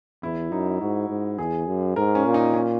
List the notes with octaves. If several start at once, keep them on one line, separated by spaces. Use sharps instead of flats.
E2 E4
F#2 D#4
G#2 F#4
G#2
E2 G#4
F#2
G#2 A#4
C#4
A#2
D#4
C#4